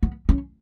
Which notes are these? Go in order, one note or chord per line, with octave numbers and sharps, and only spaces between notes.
B3
C#4